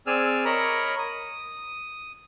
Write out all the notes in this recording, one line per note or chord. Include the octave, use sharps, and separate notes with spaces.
C4 G#4 D5 G#5 E6 F6
A#4 C#5 D#5 A#5 B5
D#6